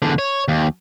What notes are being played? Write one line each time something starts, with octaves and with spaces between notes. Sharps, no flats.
E2 D3
C#5
D#2